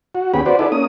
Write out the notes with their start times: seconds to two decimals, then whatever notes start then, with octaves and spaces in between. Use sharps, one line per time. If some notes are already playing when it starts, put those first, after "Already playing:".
0.15 F#4
0.34 D#2 B3 C#4 G4 G#4 B5
0.46 F#4 B4 C5 D5
0.59 D#4 E4 G#4 A4 B4 D5
0.72 A#3 C#4 D#6